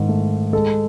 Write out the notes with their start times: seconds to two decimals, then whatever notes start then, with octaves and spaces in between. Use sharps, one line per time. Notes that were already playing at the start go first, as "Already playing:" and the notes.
Already playing: G#2 D#3
0.08 A3
0.53 G#3 A4